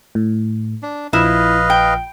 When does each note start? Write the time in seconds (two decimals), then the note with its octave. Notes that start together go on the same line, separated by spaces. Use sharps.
0.15 A2
0.83 D4
1.13 A#1 F3 E4 B4 D#5 F5
1.70 G5